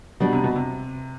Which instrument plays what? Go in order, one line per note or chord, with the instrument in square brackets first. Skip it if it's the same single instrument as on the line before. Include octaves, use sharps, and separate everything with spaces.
[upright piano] B2 [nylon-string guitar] G3 B3 D4
[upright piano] C3
B2
C3